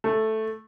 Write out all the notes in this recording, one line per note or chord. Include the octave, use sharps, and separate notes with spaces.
A3